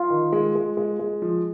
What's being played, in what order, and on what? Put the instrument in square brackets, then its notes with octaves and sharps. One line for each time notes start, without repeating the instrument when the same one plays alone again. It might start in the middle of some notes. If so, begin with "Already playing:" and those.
Already playing: [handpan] F4
[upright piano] D#3
G#3
G#3
G#3
G#3
F3